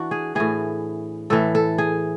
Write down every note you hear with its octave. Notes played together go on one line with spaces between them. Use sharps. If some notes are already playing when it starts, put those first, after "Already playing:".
Already playing: E3 D4 F#4
G#4
A2 E3 G#4
A2 E3 A4
A4
G#4